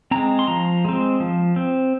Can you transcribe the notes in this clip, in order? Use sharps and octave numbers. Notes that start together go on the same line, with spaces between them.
G#3 C4 A#5
C6
F3 A#5
G#3 C4
F3
C4